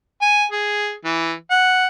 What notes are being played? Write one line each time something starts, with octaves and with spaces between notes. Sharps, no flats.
G#5
G#4
E3
F#5